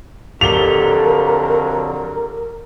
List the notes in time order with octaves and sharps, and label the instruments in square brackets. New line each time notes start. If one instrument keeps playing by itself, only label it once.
[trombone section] F2 D3 F#3 [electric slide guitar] G4 A4 [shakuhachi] A#4 [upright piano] F7 G7